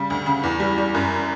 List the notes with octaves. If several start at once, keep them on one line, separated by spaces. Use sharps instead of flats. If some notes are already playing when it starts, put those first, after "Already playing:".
Already playing: C#3 G3
D2
C#3
E2
G3
G3
F#2